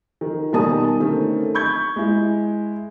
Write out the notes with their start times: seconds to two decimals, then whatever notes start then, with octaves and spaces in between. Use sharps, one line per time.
0.21 D#3
0.53 B2 D#3 G3 G#5 A5 D#6
1.00 D3 D#3 A3 C4 C#4
1.54 B5 C#6 G6 G#6
1.96 G#3 E4